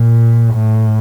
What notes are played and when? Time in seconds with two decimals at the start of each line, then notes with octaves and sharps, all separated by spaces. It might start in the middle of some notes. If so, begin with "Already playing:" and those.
Already playing: A#2
0.54 A2